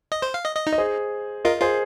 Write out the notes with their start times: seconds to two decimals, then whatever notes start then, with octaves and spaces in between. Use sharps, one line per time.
0.12 D#5
0.22 C5
0.34 F5
0.45 D#5
0.56 D#5
0.67 D#4
0.73 D#5
0.78 G#4 C5
1.45 F4 A#4 D#5
1.61 F4 G#4 C5